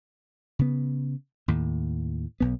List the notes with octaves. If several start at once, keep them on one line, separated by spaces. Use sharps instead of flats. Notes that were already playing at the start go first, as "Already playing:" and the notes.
C#3 B3
D#2 A2
B1 B3